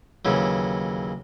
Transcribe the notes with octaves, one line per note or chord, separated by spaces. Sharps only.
D#2 C#3 E3 F#3